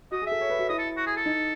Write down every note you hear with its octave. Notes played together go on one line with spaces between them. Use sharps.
F#4 D#5
G#4
E5
A4
C#5
B4
F#4
E4 D#5
A4
F#4
G#4
A4
D#4